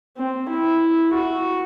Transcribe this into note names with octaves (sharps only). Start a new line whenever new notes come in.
C4
E4
F#4